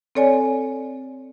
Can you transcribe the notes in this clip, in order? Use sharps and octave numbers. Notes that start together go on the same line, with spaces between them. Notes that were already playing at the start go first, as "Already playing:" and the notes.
C4 A4 C#5 D5 G#5